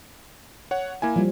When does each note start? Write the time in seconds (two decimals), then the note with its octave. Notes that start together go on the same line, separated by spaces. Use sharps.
0.71 C#5 F#5
1.02 A#3 E4 G#5
1.16 F3 G3